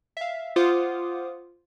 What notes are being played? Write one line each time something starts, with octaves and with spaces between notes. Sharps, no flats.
E5 F5
F4 C5 F#5 D6 D#6